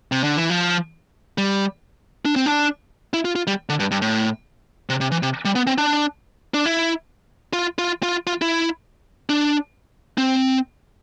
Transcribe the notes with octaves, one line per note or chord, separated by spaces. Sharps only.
C3
D3
E3
F3
G3
D4
C4
D4
E4
F4
F4
G3
D3
G2
G2
A2
C3
C3
E3
C3
G3
B3
C4
D4
D4
E4
F4
F4
F4
F4
E4
D4
C4